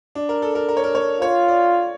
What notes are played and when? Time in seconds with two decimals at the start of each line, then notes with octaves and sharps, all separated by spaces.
0.15 D4
0.29 A#4
0.42 A4
0.55 A#4
0.69 A#4
0.77 C#5
0.84 A#4
0.95 C#5
1.21 F4 C#5
1.48 D5